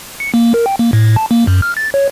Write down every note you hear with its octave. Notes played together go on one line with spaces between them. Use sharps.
C#7
A#3
A#4
G5
A#3
A2
A5
A#3
F#2
F6
A6
C#5